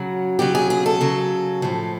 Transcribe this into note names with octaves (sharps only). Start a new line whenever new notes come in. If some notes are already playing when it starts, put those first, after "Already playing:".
Already playing: C#3 F#3 F#4
C#3 F#3 G4
G#4
G#4
A4
C#3 F#3
A2 F3